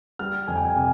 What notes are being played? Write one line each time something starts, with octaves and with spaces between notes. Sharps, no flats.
G3 F6
F2 G#5
G5
G#5
C3 G#5